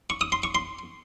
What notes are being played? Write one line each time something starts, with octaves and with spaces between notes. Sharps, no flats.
C#6
D#6
C6
C#6
C6